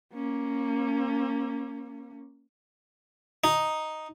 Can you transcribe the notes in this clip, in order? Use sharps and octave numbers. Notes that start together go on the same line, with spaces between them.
A#3 C#4
D#4